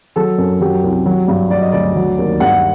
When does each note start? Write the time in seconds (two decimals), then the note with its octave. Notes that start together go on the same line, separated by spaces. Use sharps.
0.16 F#3 A4
0.38 F#2
0.61 F#3 G4
0.84 C2
1.06 F#3
1.28 G2
1.50 F#3 D5
1.62 D#5
1.72 D2 D5
1.96 F#3
2.18 D#2
2.40 G2 F#5